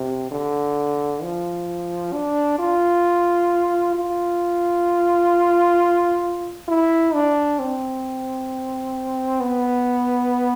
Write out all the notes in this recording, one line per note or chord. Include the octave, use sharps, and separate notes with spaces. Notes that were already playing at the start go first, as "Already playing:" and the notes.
Already playing: C3
D3
F3
D4
F4
F4
E4
D4
C4
B3